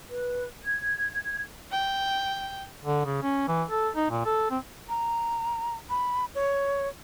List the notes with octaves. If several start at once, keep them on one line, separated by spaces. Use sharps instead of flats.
B4
G#6
G5
D3
C#3
C#4
E3
A4
D#4
A#2
A4
C4
A#5
B5
C#5